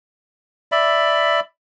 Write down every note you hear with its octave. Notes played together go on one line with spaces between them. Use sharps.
D5 E5 B5